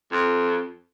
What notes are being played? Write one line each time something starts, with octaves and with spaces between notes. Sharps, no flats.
F2